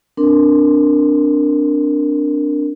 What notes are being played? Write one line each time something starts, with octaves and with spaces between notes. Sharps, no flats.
C4 D4 A#4